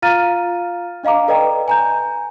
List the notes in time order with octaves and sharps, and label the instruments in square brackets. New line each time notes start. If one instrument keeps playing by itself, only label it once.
[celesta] F4 F5 A#5 F6 A6 D#7
D4 D#5 F5 A#5 D6
A4 B4 D5 D#5 G5 A#5
G#5 A#5 G6